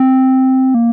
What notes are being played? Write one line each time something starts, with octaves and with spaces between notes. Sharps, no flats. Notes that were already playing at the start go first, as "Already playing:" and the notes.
Already playing: C4
A#3